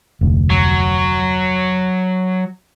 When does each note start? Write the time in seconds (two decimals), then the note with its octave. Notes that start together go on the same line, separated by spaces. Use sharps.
0.21 F1 D2
0.50 F#3